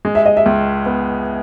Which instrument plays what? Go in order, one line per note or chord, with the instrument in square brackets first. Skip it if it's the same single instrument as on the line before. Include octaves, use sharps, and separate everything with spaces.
[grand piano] G#3
[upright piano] E5
D#5
E5
[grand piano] C#2
B3